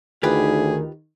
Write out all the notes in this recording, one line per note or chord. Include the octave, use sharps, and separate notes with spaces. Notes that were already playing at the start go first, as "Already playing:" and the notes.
D2 D#3 F4 G4 G#4 B4